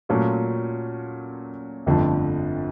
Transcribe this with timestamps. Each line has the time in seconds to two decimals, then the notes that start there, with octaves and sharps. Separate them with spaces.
0.09 A#2 F#3 A3 C#4 F4
1.86 G1 F2 D3 F3 A3